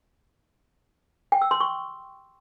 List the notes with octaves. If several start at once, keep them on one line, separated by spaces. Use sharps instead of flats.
G5
E6
C6
C#6